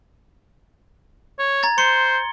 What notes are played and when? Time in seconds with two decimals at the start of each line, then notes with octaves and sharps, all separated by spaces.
1.39 C#5
1.63 A#5 G#6 A6
1.78 C5 C6 C#7 G7